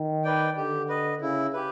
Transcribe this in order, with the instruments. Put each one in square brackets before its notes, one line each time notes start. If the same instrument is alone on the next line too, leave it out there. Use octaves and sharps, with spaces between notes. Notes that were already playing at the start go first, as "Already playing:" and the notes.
Already playing: [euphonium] D#3
[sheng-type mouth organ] B4 D5 G5
[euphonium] D3 [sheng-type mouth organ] G4
[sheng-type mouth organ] B4 D#5
[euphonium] C#3 [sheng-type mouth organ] E4
[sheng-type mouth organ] G4 B4